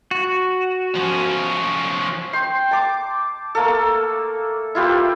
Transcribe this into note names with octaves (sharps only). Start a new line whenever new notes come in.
F#4
F3 C#4
G5 C6
A5 D6
A3 A#3 A4
E4 F4 G4 B4